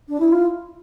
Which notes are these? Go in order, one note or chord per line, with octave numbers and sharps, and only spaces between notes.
D4
E4
F4